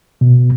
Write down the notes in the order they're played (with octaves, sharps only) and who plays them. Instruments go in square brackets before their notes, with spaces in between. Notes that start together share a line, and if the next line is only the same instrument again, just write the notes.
[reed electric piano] B2